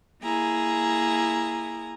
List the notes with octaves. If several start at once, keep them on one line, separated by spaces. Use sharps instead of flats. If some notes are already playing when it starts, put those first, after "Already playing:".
A#3 E4 G#4 A#5